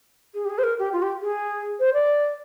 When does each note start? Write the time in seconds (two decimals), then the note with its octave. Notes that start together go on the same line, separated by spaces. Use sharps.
0.34 G#4
0.45 G4
0.50 G#4
0.58 C5
0.63 A#4
0.79 G4
0.93 F4
1.02 G4
1.21 G#4
1.80 C5
1.94 D5